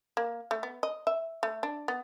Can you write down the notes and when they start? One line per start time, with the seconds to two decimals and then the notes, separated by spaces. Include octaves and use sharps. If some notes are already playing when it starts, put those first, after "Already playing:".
0.17 A#3
0.51 A3
0.63 B3
0.83 D#5
1.07 E5
1.43 A3
1.63 D4
1.88 B3